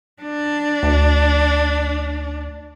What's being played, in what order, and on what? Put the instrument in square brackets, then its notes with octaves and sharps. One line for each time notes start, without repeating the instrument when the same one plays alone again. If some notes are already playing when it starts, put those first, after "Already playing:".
[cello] D4
[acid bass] D2